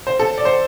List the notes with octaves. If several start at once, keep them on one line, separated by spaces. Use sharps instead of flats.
C5
A4
D5
C5